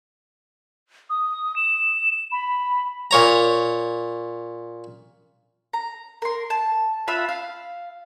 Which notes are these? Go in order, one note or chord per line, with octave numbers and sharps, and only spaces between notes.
D#6
E7
B5
A#2 C#5 A#5
A#5
A#4 C6
A5
F4 E5 F#5 B5
F5